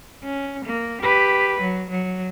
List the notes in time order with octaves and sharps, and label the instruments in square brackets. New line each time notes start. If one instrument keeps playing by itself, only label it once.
[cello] C#4
A#3
G4 B4
F#3
F#3